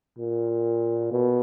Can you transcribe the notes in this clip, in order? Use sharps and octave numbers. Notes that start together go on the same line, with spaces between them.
A#2
B2